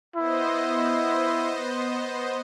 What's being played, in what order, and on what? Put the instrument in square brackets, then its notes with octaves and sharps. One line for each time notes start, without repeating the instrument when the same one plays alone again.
[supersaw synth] B3 C5 D#5 [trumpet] E4